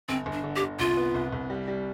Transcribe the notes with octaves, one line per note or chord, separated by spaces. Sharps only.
G1 C4
G1
D4
D3
G4
G1
C2 F4
B3
C2
C2
G3
G3